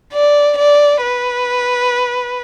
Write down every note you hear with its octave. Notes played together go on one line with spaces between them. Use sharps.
D5
D5
B4